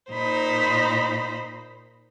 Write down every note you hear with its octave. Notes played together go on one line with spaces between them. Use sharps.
A#2 D#4 C5 B5